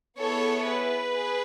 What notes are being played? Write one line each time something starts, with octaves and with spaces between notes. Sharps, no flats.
B3 E4 G#4 A4 C#5
B4
G#4